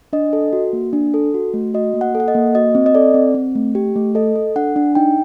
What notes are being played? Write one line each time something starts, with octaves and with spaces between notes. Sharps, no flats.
D4 D#5
A4
F#4
A#3
D4
A4
F#4
A3
F#4 D#5
A#3
F#5
A4
F#5
D#5
A#3
F#4 D#5
C4
D#5
A4 D5
C4
C4
A3
G4
A3
A4 D#5
A4
D4 F#5
D4
D#4 G5